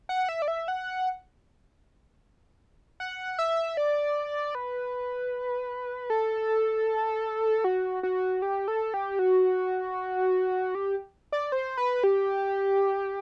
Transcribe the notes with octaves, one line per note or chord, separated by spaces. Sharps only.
F#5
E5
D5
E5
F#5
F#5
E5
D5
B4
A4
F#4
F#4
G4
A4
G4
F#4
G4
D5
C5
B4
G4